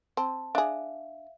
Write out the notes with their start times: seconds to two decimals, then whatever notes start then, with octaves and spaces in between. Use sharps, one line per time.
0.17 C4 A5
0.55 D4 G#4 E5 F5